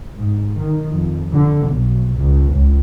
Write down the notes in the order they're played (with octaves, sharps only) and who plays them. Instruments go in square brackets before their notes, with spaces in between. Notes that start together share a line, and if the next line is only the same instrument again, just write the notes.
[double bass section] G#2
D#3
F2
D3
B1
C#2
C#2